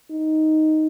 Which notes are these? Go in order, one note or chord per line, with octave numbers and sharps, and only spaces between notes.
D#4